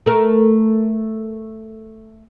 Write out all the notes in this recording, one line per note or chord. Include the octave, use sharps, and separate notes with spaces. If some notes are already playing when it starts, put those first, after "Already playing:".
A3 A#4